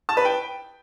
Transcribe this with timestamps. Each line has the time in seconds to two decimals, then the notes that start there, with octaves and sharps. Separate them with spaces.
0.09 A5
0.17 B4
0.25 G5